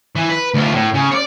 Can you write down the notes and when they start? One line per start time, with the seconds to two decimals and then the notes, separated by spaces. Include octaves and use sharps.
0.16 E3
0.29 B4
0.54 D2 F4
0.74 A2
0.94 C#3
1.11 C#5 D5